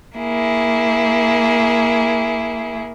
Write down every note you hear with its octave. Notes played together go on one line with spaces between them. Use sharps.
A#3 E4 G#4